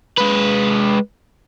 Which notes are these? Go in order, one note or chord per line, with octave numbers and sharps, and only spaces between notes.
G#3 B4